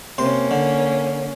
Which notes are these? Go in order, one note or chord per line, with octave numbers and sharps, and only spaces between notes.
C3 A#3 C#4 C6
D3